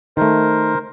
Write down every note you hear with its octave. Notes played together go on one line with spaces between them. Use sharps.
D#3 A3 A#4 C5